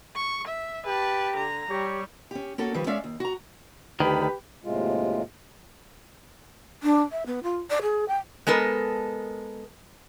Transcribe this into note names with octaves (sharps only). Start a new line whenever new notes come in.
C#6
E5
G4 B4 A5
D3 A#5
G3 G4 C#5
C#4 G4
A#3 C#4 F#4 A4
D#3 F3 G3 B4
G#3 C#4 D5 E5 F5
D#2
F#4 A#5
D2 D#3 G4 B4
D#2 A2 C3 G#3 F4
D4
E5
B3
F4
D5
G#4
G5
G#3 B3 A4 A#4